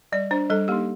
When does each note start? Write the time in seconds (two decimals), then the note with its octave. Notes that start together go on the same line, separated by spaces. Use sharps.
0.12 G3 D5
0.31 D4 C5
0.50 G3 A4
0.68 A#3 D#4 G4